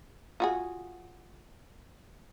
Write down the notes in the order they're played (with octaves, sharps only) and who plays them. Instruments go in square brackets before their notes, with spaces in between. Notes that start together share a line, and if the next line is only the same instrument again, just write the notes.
[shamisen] F4 F#4 G#4